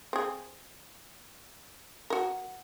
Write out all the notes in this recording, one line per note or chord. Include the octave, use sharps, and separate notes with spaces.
C4 G#4
F#4 A#4